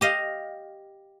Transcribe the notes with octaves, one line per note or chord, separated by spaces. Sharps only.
G4 D#5 F5